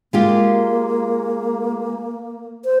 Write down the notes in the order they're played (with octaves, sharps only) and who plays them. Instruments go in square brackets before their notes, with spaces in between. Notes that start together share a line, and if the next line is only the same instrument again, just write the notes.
[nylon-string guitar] G#3 F4 G4 [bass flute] A#3
[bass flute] C5